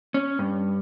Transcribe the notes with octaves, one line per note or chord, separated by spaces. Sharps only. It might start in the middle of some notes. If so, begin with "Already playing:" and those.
C#4
G2